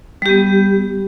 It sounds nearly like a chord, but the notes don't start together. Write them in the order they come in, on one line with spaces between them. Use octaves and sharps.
G3 G4 B3